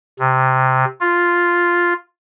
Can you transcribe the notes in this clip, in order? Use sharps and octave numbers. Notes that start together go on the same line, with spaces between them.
C3
F4